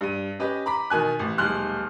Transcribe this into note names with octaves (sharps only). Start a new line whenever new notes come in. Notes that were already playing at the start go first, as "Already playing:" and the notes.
G2 D#7
C#4 G4 B4 D#5
A#5 B5 D6 B6
B2 D#3 G#5 F#6
A1
D#1 B1 G#3 C6 F6 F#6